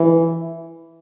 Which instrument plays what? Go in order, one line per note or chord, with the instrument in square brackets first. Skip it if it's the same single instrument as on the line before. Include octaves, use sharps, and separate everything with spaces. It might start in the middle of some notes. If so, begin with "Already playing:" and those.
Already playing: [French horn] E3